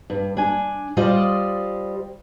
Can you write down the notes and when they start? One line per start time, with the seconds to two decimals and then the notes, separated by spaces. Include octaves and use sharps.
0.10 G2
0.37 D4 G#5
0.97 G3 F4 C5 D5 D#5